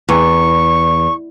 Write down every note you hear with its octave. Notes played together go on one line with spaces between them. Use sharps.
E2 C#6